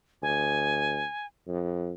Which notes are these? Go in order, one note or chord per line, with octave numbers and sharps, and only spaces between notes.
D2 G#5
F2